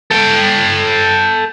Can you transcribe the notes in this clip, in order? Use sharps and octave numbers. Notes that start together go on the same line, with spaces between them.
A4 G5